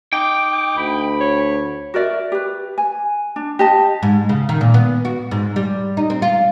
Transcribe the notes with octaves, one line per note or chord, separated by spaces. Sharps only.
D#4 G5 D6
D2 B5
C#5
F#4 A#4 D5 E5
G4 B4
G#5
D4
G4 D#5 A5
G#2
C#3
D#3
A#2
B3
F#4
G#2
G3
D#4
C4
F4